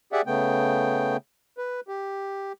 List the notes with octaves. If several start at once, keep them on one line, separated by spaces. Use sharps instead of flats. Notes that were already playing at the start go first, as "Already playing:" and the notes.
G4 G#4 D5 E5 F#5
C#3 A3 B3 G5
B4
G4